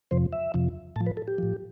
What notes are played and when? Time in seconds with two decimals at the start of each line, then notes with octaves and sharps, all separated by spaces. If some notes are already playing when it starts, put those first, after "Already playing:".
0.11 F2 C3 F3 C5
0.33 E5
0.54 F2 C3 F3
0.96 A2 F3 A5
1.06 B4
1.17 A4
1.28 G4
1.38 A2 F3